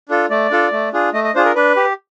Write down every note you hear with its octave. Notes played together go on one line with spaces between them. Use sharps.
D4 F4 A4
A3 D5
D4 F4 A4
A3
D4 F4 G#4
A3 D#5
D#5
D4 F4 G#4 C5
A#4
D4 B4
G4